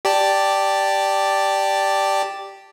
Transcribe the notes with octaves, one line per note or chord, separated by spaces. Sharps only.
G4 D5 A5